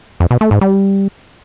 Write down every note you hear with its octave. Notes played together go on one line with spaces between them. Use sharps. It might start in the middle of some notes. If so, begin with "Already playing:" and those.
F2
B2
A3
G#2
G3